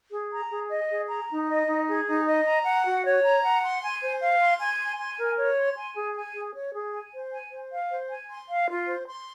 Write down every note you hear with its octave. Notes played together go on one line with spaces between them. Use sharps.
G#4
A#5
G#4
D#5
G#4
A#5
D#4
D#5
D#4
G#4
D#4
D#5
A#5
F#5
F#4
C#5
A#5
F#5
C6
G#5
C5
F5
C6
G#5
C6
G#5
A#4
C#5
C6
G#5
G#4
G#5
G#4
C#5
G#4
G#5
C5
G#5
C5
F5
C5
G#5
C6
F5
F4
C5
C6